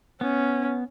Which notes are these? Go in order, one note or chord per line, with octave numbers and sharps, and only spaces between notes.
B3 C#4